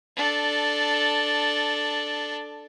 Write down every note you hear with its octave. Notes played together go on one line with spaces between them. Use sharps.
D4 A4